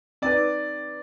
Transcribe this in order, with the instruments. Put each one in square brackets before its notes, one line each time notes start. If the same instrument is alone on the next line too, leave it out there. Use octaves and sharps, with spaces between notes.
[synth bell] C4 D#4 B4 [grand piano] D5